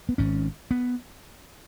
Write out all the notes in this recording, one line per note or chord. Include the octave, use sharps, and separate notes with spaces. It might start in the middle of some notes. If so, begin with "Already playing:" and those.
B3
G#1 G#2 C#4
B3